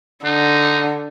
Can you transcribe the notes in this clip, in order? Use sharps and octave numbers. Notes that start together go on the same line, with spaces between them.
D3 D#4